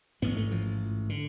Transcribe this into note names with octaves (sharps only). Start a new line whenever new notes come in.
A1 G#2 B3
A3
F3
D3